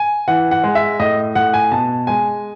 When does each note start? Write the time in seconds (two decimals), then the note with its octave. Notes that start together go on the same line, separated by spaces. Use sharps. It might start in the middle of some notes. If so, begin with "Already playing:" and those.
Already playing: G#5
0.28 E3 F#5
0.51 F#5
0.64 G#3
0.75 E5
0.99 A2 D#5
1.35 A2 F#5
1.54 G#5
1.71 B2 A5
2.07 G#3 G#5